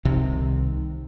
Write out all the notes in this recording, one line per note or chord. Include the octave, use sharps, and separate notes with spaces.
C2 C3 D#3